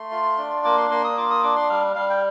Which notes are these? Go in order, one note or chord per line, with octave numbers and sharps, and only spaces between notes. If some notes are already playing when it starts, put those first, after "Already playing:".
Already playing: A3 C6
F4
D4
A#3 D6
C6
A#3 C6
D#6
F4 D6
D#6
D4 D6
C6
G3 F5
G3 F5
G5